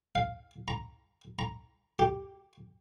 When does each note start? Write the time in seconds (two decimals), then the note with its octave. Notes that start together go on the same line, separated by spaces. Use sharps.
0.15 F5
0.68 A#5
1.39 A#5
1.99 G4